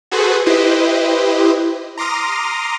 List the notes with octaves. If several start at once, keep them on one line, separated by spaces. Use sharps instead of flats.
F#4 G#4 A4 B4 C5
E4 G4 B4 C5 D#5
A#5 C6 D6 D#6 F6 A#6